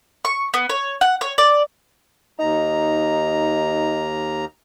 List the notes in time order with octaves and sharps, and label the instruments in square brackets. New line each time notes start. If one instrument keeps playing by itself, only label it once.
[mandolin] C#6
B3
C#5
F#5
C#5
D5
[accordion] D#2 A#5 [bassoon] D#4